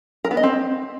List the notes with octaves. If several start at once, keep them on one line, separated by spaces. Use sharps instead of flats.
A#4
B3
D#5
C4